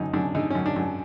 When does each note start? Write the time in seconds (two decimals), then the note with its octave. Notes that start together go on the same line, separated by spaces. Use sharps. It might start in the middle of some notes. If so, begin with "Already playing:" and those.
Already playing: F#2 D3 D#4
0.13 F#2 D4
0.35 D3 D#4
0.50 C#4
0.55 F#2
0.66 D4
0.76 F#2